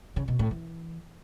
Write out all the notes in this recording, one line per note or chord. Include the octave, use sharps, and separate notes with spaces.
C#3
B2
A2
E3